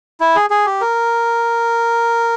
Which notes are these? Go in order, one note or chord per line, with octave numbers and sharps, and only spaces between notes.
E4
G#4
G#4
G4
A#4